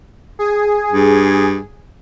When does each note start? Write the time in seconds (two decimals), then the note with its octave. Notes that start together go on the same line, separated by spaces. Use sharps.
0.39 G#4
0.93 G2